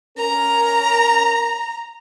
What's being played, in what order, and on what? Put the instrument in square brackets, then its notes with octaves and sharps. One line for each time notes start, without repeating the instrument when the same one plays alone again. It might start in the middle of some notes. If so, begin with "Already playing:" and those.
[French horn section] C#4 A#4 [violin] A#5